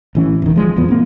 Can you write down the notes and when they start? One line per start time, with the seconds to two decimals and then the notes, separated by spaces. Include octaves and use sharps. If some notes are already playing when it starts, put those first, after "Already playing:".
0.15 A1 E3 C#4
0.42 E1 D#3
0.56 F3 G#3
0.76 D1 E2 F3 B3
0.88 A#3 C4